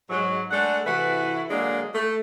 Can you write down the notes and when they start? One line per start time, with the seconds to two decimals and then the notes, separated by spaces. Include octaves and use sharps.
0.10 G#2 F#3
0.51 G#3 A3 D4 A4 F#5
0.87 C3 E3 E4 F#4 A4 B4
1.50 D3 F#3 G#3 A#3 D4
1.95 A3